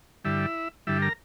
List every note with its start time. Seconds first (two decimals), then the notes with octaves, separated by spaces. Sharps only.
0.24 G2 D3 G3 E4 E5
0.87 G2 D3 G3 E4 E5
1.02 A#4 A#5